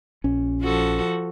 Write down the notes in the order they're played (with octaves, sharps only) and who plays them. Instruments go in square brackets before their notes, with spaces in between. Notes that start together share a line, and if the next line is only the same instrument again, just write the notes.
[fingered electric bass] A#1 C#4
[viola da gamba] F3 F#4 A4